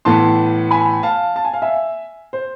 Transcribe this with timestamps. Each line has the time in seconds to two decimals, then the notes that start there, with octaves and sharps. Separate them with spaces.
0.05 A2 E3 B3 A5 C6
0.71 G#5 B5
1.03 F5 A5
1.36 A5
1.45 G#5
1.53 F5
1.62 E5 G#5
2.33 C5